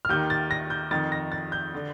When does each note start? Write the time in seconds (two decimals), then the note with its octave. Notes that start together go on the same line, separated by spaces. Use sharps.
0.05 F6
0.09 D#2 D#3 G6
0.30 A6
0.51 A#6
0.70 G6
0.91 F2 D#3 A6
1.12 A#6
1.32 A6
1.52 G6
1.74 D3